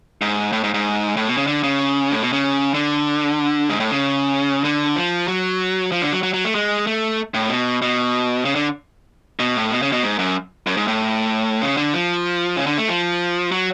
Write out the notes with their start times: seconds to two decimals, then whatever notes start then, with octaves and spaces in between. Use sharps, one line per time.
0.21 G#2
0.53 A2
0.63 G#2
0.74 G#2
1.17 A2
1.27 B2
1.37 C#3
1.47 D3
1.63 C#3
2.12 A2
2.22 B2
2.33 C#3
2.74 D3
3.69 G#2
3.80 A2
3.91 C#3
4.64 D3
4.96 F3
5.28 F#3
5.92 F3
6.02 D3
6.12 F#3
6.23 F#3
6.34 F#3
6.45 A3
6.55 G#3
6.87 A3
7.34 A2
7.49 B2
7.82 B2
8.45 C#3
8.55 D3
9.39 B2
9.56 A2
9.71 B2
9.82 C#3
9.92 B2
10.03 G#2
10.19 F#2
10.67 F#2
10.77 G#2
10.88 A2
11.62 C#3
11.77 D3
11.93 F3
12.57 C#3
12.66 D3
12.77 A3
12.88 F3
13.52 F#3